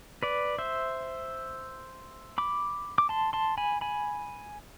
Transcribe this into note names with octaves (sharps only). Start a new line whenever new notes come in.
B4 D5
C5 E5
B5 D6
D6
A5 C6
A5 C6
G#5 B5
G#5 B5